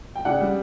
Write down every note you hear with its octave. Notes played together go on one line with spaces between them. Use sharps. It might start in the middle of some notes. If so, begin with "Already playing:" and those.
G5
C#3 D5 F#5
G3